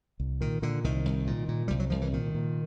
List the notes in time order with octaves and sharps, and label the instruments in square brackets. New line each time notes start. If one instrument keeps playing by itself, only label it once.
[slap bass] C2
A#2 D#3
A#2 D3
C2 D#3
C2
A#2
A#2
C2 G3
F#3
C2 F3
E3
A#2 D#3
A#2